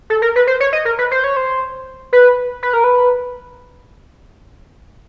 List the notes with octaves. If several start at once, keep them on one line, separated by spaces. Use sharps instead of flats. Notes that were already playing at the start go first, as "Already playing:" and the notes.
A4
A#4
B4
C5
C#5
D#5
A#4
B4
C5
C#5
C5
B4
B4
A#4
B4